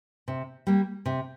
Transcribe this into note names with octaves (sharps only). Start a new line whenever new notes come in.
C3
G3 A#3
C3